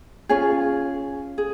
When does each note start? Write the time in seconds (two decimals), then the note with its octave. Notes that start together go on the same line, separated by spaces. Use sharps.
0.29 C#4 F4 G#4 C#5
1.38 G#4